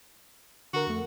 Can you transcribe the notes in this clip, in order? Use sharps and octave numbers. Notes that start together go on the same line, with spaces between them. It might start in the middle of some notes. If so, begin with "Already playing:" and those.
D3 F#4 A#4
F2 A3